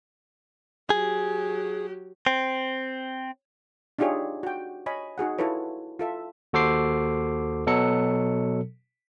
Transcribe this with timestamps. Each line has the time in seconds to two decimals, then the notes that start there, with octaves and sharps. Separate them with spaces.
0.90 F#3 G4 G#4
2.27 C4
3.99 D4 D#4 F4 G4 G#4 C#5
4.43 F#4 G5
4.86 C#5 D#5 G#5 B5
5.18 D#4 F#4 G#4 F#5
5.38 E4 F4 A4 B4 C#5
5.99 F4 A4 E5
6.53 D#2 F#4 A4 C5 D6 C7
7.67 B2 F#3 A4 C#7